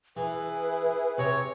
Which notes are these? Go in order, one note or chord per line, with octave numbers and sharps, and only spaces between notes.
E3 E4 G#4 B4
C3 C#5 A#5